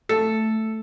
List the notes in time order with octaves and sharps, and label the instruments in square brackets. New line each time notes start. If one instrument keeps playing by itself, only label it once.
[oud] A3 [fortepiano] A4